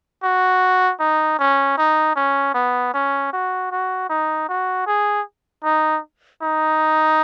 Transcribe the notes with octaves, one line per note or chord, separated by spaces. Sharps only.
F#4
D#4
C#4
D#4
C#4
B3
C#4
F#4
F#4
D#4
F#4
G#4
D#4
D#4